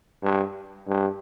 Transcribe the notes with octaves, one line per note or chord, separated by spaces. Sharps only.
G2
G2